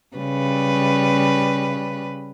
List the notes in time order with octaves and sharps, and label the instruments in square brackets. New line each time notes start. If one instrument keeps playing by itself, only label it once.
[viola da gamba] C#3 G3 B4